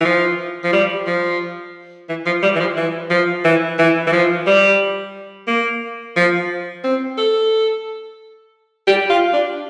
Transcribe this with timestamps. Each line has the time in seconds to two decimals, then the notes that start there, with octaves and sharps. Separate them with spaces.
0.01 E3
0.05 F3
0.64 F3
0.73 G3
1.07 F3
2.09 E3
2.26 F3
2.43 G3
2.55 E3
2.60 F3
2.77 E3
3.10 F3
3.45 E3
3.79 E3
4.07 E3
4.12 F3
4.47 G3
5.48 A#3
6.16 F3
6.84 C4
7.18 A4
8.88 G4
9.10 F4
9.33 D4